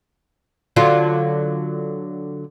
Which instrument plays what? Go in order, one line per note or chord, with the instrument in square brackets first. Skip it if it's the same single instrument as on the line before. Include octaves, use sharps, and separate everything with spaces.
[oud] D3 F#3 F4